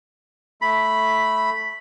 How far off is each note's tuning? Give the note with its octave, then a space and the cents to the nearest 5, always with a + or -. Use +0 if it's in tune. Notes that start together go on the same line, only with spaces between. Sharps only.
A3 -5 B5 +0